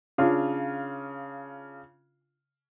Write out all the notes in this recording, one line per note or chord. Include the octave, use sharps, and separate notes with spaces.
C#3 D4 F4